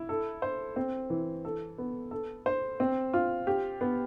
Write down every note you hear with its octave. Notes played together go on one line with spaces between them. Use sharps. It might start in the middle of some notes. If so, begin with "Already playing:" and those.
Already playing: E4
A4
C5
C4
E3
A4
B3
A4
C5
C4
F4
G4
B3